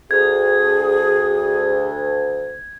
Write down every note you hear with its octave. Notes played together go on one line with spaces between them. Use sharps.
D2 G#4 G#6